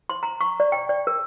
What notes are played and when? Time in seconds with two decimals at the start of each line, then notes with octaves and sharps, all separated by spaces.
0.10 C6
0.23 A#5
0.41 C#6
0.60 D5
0.72 G5
0.89 D5
1.07 A#4